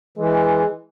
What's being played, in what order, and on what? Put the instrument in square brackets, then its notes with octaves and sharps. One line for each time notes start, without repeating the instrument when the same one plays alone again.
[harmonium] E3 [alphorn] G#3